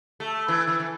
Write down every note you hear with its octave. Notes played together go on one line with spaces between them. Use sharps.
A3
E3
E3
E3